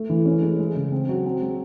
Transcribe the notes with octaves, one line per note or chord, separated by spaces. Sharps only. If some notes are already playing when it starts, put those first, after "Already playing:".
Already playing: A3
E3
C#4
G#3
G#3
C#3
C4
F#3
C4
G#3